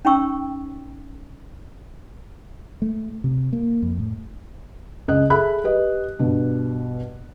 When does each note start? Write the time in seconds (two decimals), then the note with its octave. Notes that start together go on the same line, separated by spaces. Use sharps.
0.05 C#4 D#4 G5 C#6 E6
2.82 A3
3.24 C3
3.53 A#3
3.82 F2
3.99 A2
5.08 C#2 D#5 F#6
5.30 G#4 A4 E5 B5 F#6
5.64 G4 B4 D#5
6.19 G2 B2